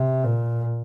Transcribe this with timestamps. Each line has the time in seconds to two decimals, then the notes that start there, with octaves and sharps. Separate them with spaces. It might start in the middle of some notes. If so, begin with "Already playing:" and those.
Already playing: C3
0.24 A#2